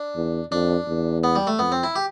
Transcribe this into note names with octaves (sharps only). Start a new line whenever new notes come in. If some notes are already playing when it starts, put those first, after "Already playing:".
Already playing: D4
E2
F2 D4
E2
B3
G3
A3
F2 B3
C4
E4
G4